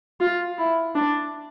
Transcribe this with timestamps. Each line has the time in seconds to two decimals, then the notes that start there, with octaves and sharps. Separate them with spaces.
0.20 F4
0.58 E4
0.95 D4